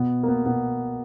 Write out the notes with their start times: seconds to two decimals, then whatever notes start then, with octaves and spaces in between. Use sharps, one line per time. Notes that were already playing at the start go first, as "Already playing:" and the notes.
Already playing: B2 B3
0.23 A#3
0.28 B3
0.46 B2 B3